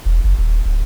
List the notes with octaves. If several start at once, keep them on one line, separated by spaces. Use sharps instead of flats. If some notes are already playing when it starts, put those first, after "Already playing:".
E1
F#1
D#1
D1